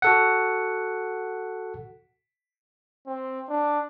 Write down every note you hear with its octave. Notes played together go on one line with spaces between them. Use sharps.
F#4 A4 F#5
C4
D4